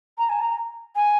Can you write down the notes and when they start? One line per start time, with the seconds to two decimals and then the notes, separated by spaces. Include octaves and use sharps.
0.18 A#5
0.29 G#5
0.41 A#5
0.96 G#5